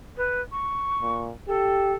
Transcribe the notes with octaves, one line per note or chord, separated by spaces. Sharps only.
B4
C#6
A#2
G4 A4